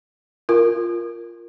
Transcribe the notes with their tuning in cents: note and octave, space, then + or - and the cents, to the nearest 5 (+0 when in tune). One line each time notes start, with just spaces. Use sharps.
F4 -5 A#4 +0